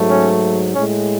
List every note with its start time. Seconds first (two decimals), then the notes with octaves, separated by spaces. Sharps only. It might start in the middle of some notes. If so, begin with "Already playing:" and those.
Already playing: G#2 F#3 A3
0.10 C#4
0.74 A2 G#3 C#4